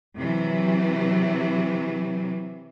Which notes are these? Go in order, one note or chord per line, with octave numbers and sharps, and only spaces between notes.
C3 E3 F#3